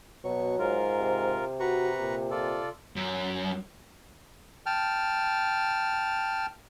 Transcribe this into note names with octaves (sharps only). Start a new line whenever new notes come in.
B2 F#3 C#6
G#2 F4 A#4
C3
F#4 B4 A#5 C#6
A#2
F4 A4 D5
F#2
G5 A5 F6